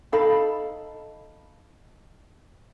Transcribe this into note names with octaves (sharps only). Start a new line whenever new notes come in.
D#4 A4 F5 B5